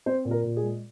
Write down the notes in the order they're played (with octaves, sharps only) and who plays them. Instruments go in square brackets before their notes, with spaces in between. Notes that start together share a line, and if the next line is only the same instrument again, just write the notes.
[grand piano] C4 C5
A#2
A#4
A#2
G#4
G#3